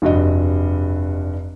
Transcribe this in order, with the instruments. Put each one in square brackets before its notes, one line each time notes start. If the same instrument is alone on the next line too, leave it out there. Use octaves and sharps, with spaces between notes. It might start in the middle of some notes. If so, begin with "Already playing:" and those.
[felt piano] F1 G2 F#4 D#5